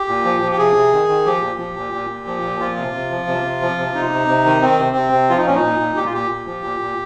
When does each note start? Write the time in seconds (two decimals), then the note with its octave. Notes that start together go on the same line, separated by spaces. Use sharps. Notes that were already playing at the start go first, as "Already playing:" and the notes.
Already playing: G4
0.08 A#2
0.25 F3
0.42 F3
0.52 G4
0.58 C3 G#4
0.76 C3
0.93 D#3
1.09 D#3
1.26 F3 G4
1.42 A#2
1.59 F3
1.77 A#2
1.93 A#2
2.10 A#2
2.27 F3
2.43 A#2
2.60 F3 F4
2.77 C3
2.94 C3
3.11 F3
3.27 C3
3.44 C3
3.62 F3
3.78 C3
3.95 C3 D#4
4.11 C3
4.28 C3
4.46 D#3
4.62 D#3 C4
4.79 C3
4.96 C3
5.13 C3
5.29 F3 F4
5.38 D#4
5.46 A#2 C#4
5.55 D#4
5.64 A#2
5.80 A#2
5.96 A#2 G4
6.05 F4
6.13 A#2 G4
6.31 A#2
6.47 F3
6.64 A#2
6.81 A#2